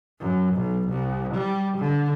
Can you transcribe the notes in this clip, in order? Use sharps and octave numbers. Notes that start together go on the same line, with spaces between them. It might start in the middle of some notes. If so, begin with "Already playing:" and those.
F#2
B1
C2
G3
D3